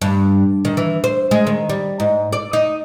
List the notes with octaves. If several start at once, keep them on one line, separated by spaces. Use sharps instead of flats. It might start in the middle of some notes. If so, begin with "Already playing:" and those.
G2
D#3
E3
C5
G#3
D#3
G3
G#2
D5
D#4